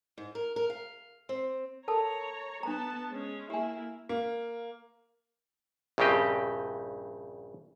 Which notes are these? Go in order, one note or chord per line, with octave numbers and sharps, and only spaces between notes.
G#2
A#4
A#4
F5
C4
A4 A#4 C#5 A5 A#5
B3 D4 A5 A#5
G#3 C#4
A#3 E4 G4 G#5
A#3
A#1 G2 C#3 C4 G4 D#5